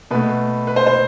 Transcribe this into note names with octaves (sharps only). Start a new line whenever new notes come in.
B2 A3 B4
B4
C5
C5